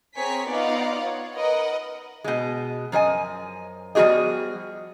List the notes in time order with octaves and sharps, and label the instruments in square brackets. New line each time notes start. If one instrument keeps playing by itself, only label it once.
[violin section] C4 G#4 A#4 C#5 G#5 B6
B3 D#4 F4 D5 F5 F#5
C#5
A#4 B4 D#5 F#5
[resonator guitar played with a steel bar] B2 G#3
F#2 F3 D#5 G#5
F3 G3 B3 F#4 G#4 D#5